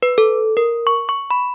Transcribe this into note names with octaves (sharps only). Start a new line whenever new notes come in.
B4
A4
A#4
C#6
C#6
B5